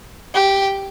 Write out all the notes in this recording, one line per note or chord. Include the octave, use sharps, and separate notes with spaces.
G4